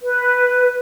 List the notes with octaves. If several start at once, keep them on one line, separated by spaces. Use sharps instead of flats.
B4